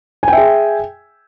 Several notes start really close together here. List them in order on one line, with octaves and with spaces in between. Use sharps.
G#5 G5 E5 G#4